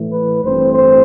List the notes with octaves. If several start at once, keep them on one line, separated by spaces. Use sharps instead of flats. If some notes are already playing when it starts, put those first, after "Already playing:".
Already playing: A2 E3 A3
B4
A1 G2 E3 A3 C4 C5
C5